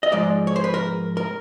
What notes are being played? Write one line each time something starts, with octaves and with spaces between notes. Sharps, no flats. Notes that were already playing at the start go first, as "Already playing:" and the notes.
D#5
G#2 F3 G#3 D5
C#5
C5
B4
A#4
A#4